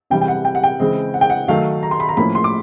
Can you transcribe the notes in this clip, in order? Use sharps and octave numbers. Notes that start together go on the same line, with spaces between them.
C3 E3 G3 G5
G5
F#5
G5
F#5
G5
C#3 E3 G#3 C4
F#5
G5
F#5
D#3 F#3 A3 F5
A#5
C6
B5
A#5
A2 F3 A#3 C#4 B5
C6
D6